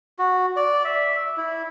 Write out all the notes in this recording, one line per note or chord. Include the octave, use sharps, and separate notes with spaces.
F#4
D5
E5
E4